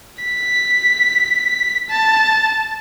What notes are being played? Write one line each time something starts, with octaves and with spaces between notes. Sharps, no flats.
B6
A5